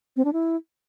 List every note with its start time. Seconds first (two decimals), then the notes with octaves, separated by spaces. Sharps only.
0.16 C4
0.25 D4
0.33 E4